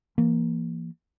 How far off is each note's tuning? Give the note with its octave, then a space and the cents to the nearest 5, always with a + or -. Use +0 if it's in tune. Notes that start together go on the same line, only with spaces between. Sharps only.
E3 +40 A#3 +0